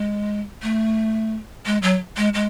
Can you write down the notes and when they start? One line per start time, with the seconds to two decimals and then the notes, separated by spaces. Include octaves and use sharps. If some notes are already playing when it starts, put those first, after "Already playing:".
Already playing: G#3
0.63 A3
1.66 G#3
1.82 F#3
2.17 G#3
2.34 G#3